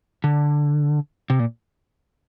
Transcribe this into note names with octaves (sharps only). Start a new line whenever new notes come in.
D3
C3
A#2